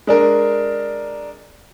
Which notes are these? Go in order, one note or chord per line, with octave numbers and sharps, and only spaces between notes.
G#3 D4 A#4